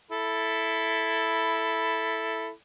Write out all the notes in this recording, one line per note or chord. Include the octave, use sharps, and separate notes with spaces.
E4 A4 B5